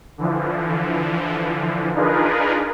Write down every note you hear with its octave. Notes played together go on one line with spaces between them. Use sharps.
D3 E3 F3
D4 D#4 F4 G#4 A#4 B4